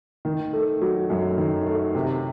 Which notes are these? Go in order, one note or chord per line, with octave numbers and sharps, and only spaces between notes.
D#3
A3
F#3
F#2
D#3
A3
C3